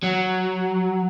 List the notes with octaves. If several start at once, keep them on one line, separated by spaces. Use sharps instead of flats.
F#3